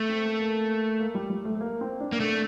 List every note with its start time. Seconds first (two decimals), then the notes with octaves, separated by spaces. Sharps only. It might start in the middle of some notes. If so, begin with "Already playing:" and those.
Already playing: A3
0.09 C4
0.25 A#3
0.39 A#3
1.00 A#3
1.15 G3
1.30 G3
1.45 A3
1.55 A3
1.61 A#3
1.81 C4
2.00 D4
2.12 A#3
2.20 A3 D4